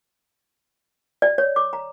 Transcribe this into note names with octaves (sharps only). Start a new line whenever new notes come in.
D5
C#5
D6
A#5